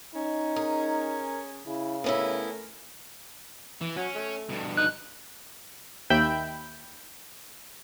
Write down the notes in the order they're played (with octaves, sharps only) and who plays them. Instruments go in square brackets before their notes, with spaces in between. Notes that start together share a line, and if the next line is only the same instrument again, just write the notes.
[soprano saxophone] C#4 [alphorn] D#4
[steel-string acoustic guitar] G#4 [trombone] A#4
[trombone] C#3 [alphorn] E4
[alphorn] A3 [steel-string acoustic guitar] B3 C#4 E4 [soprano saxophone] A#4
[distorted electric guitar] E3
[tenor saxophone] F#3 [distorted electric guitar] C#4
[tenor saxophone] A3
[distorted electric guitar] G2 B2
[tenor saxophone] D#4 [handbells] F#6
[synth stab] D#2 E5 G5 B5 G6